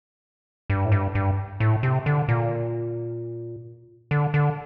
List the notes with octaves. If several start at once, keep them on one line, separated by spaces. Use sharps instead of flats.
G2
A2
G2
G2
A2
C3
D3
A#2
D3
D3